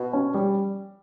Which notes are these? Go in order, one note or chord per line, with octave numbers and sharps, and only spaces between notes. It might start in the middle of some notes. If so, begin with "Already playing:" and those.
Already playing: B2
C#4
G3